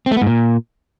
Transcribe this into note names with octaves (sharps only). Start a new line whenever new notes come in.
C4
A3
B3
G#2
A#2